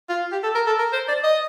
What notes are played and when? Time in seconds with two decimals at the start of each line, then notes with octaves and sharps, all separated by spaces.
0.09 F4
0.32 G4
0.43 A4
0.55 A#4
0.66 A4
0.79 A#4
0.93 C5
1.08 D5
1.24 D#5